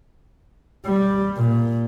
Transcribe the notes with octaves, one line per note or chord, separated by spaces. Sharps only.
G3
A#2